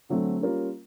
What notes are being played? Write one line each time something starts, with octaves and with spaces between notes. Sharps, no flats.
D3 F#3 A3 C4
G3 A#3 C#4 F4 A#4